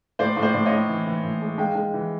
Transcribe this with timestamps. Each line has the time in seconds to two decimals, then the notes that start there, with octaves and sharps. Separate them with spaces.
0.19 A2 C5 D5
0.37 A2
0.42 C5 D5
0.54 A2 D5
0.65 C#5 D#5
0.71 A2
0.89 E3
1.06 E3
1.24 A2
1.42 G#3
1.58 G#3 F5 G5
1.75 G#3
1.94 E3